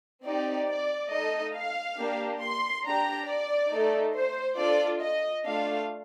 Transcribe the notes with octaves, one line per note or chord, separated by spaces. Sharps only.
C4 D#4 G4 D5
D5
A3 D#4 A4 D#5
F5
A#3 D4 G4
C6
D4 G4 A#5
D5
A3 D#4 A4
C5
D4 F4 A4 D5
D#5
A3 D4 F4 A4 F5